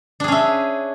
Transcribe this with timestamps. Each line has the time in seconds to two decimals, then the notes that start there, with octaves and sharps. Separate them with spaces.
0.20 D4
0.24 G#4
0.28 C#4
0.32 E5